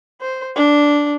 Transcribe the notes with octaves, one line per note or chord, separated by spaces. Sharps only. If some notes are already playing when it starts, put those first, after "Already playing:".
C5
D4